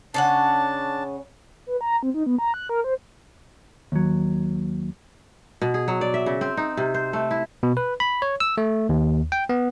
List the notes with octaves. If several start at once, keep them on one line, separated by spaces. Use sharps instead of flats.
C#3 C#4 D4 F#5 A5
B4
A#5
C4
D#4
B3
A#5
F#6
A#4
C5
D#2 F#3
B2
G#4
F#3
D5
E5
C#3
C4
D#4
C3
C5
A3
E4
B2
B4
B5
C#5
E6
A3
D#2
G5
B3